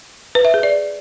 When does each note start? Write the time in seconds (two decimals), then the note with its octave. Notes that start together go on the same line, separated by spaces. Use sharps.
0.35 B4
0.45 E5
0.54 G#4
0.63 D5